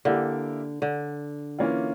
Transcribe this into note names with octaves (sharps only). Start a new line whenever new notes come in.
D3 A#3 E4 G4
D3
E3 A#3 C#4 F4